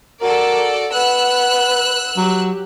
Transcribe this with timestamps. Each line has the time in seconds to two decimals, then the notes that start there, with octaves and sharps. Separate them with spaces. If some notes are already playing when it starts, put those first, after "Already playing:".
0.21 F#4 A4 A#4 D5
0.92 B4 F#5 E6 F#6
2.17 F#3 G4